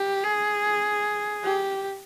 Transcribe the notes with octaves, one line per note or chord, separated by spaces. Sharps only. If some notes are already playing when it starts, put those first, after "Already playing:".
Already playing: G4
G#4
G4